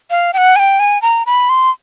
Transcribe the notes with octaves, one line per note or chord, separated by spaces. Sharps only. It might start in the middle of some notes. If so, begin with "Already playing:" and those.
F5
G5
F#5
G#5
G5
G#5
A#5
B5
C6